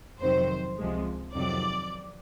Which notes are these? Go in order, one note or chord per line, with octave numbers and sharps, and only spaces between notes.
F2 C3 D#3 F#3 C5
C#2 C3 F3 G#3
F2 C3 D#3 F#3 D5